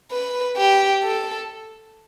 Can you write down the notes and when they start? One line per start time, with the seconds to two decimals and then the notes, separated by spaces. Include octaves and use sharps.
0.12 B4
0.57 G4
1.03 A4